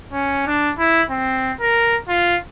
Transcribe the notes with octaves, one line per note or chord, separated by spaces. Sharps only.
C#4
D4
E4
C4
A#4
F4